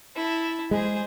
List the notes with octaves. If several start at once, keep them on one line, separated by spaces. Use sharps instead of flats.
E4 A5
G#3 G#4 C5